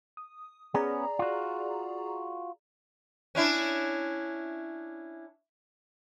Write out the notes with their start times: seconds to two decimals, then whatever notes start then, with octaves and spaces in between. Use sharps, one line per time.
0.17 D#6
0.75 B3 C#4 G#4 D5 A#5
1.19 F4 F#4
3.35 C#4 D4 E4